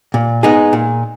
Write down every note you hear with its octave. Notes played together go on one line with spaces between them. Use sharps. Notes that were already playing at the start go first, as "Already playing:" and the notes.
A#2
G#3 B3 D#4 G#4
A#2